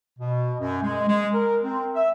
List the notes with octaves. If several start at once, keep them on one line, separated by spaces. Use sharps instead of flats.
B2
F#2
G#3
G#3
A#4
C4
E5